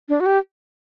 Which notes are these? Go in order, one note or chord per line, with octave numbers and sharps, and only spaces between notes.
D4
F#4
G4